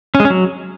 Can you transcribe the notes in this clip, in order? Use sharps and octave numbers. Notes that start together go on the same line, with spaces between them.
C#4
G#3
C#4
F#3